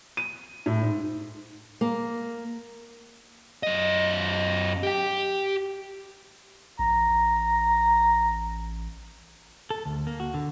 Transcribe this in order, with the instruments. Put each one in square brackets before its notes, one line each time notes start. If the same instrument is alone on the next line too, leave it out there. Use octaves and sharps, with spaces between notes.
[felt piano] D#7
A2
G#2
[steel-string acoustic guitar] A#3
[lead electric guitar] F#2 D#5
G4 G5
[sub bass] A1 [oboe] A#5
[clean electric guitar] A4
D2
A#3
F#4
D3